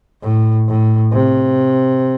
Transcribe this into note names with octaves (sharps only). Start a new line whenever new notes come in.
A2
A2
C3